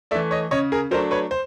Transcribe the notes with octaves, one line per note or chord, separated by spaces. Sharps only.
E3 A3 D5 E5
C#5 D#5
C#3 C#5 D#5
G#4 A#4
F#3 A3 D4 A#4 C5
B4 C#5
C5